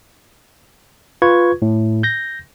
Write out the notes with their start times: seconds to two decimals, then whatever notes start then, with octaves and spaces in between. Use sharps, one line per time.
1.22 F4 B4 C#6 G#6
1.62 A2
2.03 G6 A#6